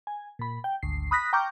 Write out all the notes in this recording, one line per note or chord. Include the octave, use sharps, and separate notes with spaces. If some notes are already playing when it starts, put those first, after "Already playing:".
G#5
A#2 B5
G5
G#1 D2 C7
B5 D#6 F#6 A#6 B6
G5 A#5 C#6 D6 F6 G6